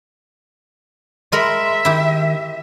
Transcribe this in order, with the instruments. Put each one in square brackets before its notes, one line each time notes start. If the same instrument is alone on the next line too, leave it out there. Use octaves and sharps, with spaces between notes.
[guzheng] G#3 A#4 B5 [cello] E5 [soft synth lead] C6
[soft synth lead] D#3 [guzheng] E4 G4